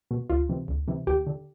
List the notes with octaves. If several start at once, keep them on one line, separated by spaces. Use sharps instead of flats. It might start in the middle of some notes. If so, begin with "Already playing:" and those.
B2
D2 F4
C3 E3
D2
C3 E3
D#2 G4
D3